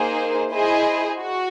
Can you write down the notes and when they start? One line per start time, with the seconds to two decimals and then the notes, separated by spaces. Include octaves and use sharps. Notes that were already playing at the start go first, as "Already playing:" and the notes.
Already playing: A#3 D#4 G#4 C5
0.52 E4 G#4 C5 D#5
1.20 F#4